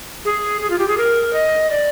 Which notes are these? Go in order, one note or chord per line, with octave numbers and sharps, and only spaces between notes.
G#4
G#4
F4
G4
G#4
A#4
D#5
D5